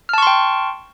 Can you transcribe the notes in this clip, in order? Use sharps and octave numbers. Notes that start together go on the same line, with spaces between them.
G5 A5 C6 C#6 F6